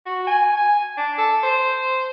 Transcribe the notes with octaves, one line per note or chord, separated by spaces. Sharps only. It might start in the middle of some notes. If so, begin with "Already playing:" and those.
F#4
G#5
G#5
D4
A4
C5